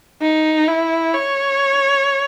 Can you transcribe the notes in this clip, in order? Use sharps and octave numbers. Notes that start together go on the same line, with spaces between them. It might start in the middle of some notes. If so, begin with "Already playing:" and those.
D#4
E4
C#5